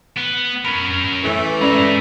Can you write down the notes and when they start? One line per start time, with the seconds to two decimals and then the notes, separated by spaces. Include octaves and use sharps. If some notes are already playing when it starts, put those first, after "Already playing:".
0.17 B3
0.65 C#4 A#4 B5
1.24 E3 A3
1.61 G#3 C#4 D5 A#5